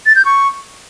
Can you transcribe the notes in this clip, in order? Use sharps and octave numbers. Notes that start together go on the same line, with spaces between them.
A6
G6
C#6